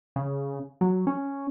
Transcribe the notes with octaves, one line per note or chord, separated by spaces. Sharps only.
C#3
F#3
C#4